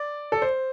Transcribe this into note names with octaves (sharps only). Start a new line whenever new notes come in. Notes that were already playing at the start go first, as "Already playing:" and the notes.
Already playing: D5
A4
C5